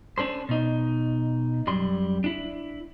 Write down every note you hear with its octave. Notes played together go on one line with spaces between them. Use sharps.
C#4 D4 A4 C5
B2 D#4
F#2 G3 C6
D4 E4